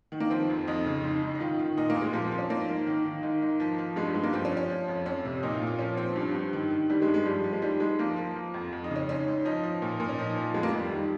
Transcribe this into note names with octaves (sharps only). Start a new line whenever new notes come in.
D#3
A#3
F3 C4
F2
F2 D#4
C#3
G#2
G#2
D#4
D#3 F4
D#3
A#2 D#4
A#3
A#2
G#3
F3 A#3
F3 C4
C#4
G#2 A#3
G#2
D#3
D#3
G#2
G#2
F3
F3
G2 G#3
G3
G2 G#3
A#3
F3 C4
C#4
F3
C#4
F3
F2
F2 C#4
C3
A#2 D#4
F4
A#2
F4
F3 C#4
F3 C4
G2
G2
D#3
D#3
G2 G3
G#3
G2
G#3
F3 G3
F3
G#3
G#2 G3
G#2 G#3
F3 A#3
F3
F3
F2
F2
D#4
C#3
C#4
G#2 C#4
G#2
F3 D#4
F3
A#2
A#2
C#4
F3 D#4
F3
F2 G#3
A#3
G#3
F2
G3
D#3